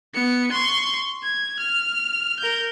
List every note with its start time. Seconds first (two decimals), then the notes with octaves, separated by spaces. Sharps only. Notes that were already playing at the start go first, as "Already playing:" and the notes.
0.14 B3 C#7
0.52 C6 C#6
1.23 G#6
1.60 F6
2.39 A#4 G6